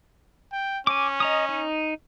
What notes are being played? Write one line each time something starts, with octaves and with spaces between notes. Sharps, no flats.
G5
C#4 G#5 D6
D#5 A#5 D#6
D#4